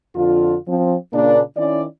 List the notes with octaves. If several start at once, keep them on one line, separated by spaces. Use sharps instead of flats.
F2 D3 F4
F3 C4
A#2 C#3 A#3 D4
D#3 C#4 E4 D5